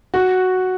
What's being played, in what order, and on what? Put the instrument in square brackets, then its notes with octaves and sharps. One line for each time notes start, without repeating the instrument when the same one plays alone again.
[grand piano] F#4